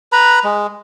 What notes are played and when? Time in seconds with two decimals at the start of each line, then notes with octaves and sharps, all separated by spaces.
0.12 B4 A#5 B5
0.44 G#3